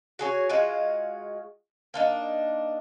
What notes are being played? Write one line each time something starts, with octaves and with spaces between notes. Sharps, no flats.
F#4 G#4 C#5
G#3 F4 F#4
A#3 D4 D#4